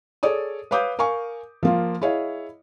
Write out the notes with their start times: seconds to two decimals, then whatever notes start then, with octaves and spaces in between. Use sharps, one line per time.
0.23 G#4 A4 C#5 D5 D#6
0.71 B4 C#5 F5 D6 D#6 G6
0.99 A#4 F5 G#5 C#6
1.63 F3 A#3 F4
2.01 E4 G#4 C#5 D#5 F5